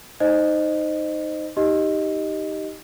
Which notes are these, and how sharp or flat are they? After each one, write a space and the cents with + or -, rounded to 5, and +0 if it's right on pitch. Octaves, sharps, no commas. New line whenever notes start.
D#4 +0 C5 -5 D#5 -20
D#4 +10 G4 +0 D#5 +0